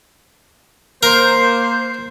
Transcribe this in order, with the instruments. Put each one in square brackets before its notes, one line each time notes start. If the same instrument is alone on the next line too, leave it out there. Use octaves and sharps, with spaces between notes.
[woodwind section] A#3 C5 [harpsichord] A#4